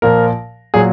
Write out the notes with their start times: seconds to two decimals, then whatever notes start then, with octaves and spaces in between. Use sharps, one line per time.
0.02 A#2 F3 A#4
0.74 A#2 F#3 G#4